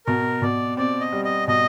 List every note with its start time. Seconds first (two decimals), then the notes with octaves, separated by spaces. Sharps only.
0.06 B2 A#4
0.42 B2 D5
0.77 C4 D5
1.01 D#5
1.12 G3
1.25 D#5
1.48 B2 D#5